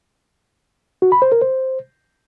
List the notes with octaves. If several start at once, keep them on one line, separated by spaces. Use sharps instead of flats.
F#4
B5
C5
A#4
C5